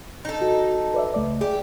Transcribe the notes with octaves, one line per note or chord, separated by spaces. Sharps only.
D#4 A4
F#4
B4 D5 E5
C#2 A3 D5
G4 G#4